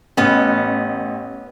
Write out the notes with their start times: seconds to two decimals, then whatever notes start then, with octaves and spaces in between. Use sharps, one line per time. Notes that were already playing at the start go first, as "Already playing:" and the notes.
0.17 A1 B3 C#4